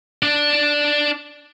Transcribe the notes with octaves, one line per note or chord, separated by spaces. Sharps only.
D4 D5